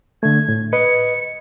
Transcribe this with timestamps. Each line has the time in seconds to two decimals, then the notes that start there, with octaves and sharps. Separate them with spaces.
0.23 D3 A3 G#6
0.49 A2
0.73 B4 D#5 C#7